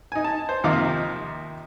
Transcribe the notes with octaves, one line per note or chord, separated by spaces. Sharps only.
D#4 G#5
A5
C5
D#2 C3 F3 D#4 F5 D6